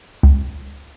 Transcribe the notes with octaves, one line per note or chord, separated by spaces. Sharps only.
C#2